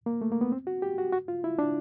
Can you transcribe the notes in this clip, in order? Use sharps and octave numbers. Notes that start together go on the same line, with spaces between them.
A#3
A3
A#3
B3
C4
F#4
G4
F#4
F#4
F4
E4
D4